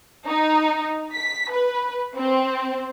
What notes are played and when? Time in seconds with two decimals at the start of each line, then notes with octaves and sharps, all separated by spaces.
0.27 D#4
1.14 B6
1.53 B4
2.16 C4